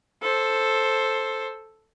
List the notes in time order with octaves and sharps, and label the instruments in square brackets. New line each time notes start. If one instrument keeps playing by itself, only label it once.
[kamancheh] A4 C5